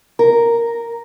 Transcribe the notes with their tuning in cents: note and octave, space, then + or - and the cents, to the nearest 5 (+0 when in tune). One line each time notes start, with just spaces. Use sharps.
A#4 +0